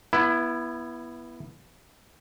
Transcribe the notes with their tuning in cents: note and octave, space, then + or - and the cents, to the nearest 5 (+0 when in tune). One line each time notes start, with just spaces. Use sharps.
B3 -15 E4 +10